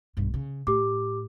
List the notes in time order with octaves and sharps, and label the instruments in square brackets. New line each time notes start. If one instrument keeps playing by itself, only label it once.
[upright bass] B1 G2
C#3
[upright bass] A2 [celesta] G4 D6